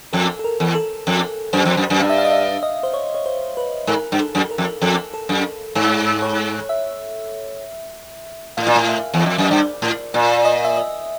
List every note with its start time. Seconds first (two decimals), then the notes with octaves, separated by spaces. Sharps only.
0.13 F2 A4
0.39 A4
0.44 A#4
0.60 E2
0.75 A4
1.07 F2
1.53 F#2 C5
1.65 F2
1.77 F#2
1.90 F#2
2.00 G2 F5
2.10 E5
2.18 F5
2.25 D#5
2.32 E5
2.63 D#5
2.83 C5
2.94 C#5
3.15 C#5
3.26 C5
3.57 B4
3.87 G#2 A#4
4.12 G2
4.20 A4
4.35 F#2
4.51 A#4
4.58 F2
4.82 F2 A4
5.14 A4
5.29 F#2
5.75 G#2 A4
6.22 C#5
6.69 E5
8.57 A2 F5
8.67 A#2
8.76 A2 F5
8.89 E5
9.14 E2
9.20 D#5
9.26 F2
9.38 F#2 D#5
9.51 G2 D5
9.82 A2
10.14 A#2
10.45 D#5
10.65 E5
10.77 D#5